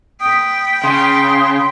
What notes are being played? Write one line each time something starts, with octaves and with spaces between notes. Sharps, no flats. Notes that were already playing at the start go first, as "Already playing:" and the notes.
B4 G5 D#6
C#3 C6 D#6